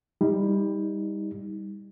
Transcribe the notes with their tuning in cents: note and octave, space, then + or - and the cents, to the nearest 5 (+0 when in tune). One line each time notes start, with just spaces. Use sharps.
G3 +20 D#4 +30